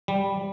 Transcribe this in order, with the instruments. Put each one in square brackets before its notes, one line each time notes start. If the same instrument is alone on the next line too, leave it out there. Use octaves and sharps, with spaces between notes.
[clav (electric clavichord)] G3